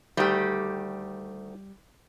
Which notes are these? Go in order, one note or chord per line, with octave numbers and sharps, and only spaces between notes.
D2 D#3 G3 A3 G4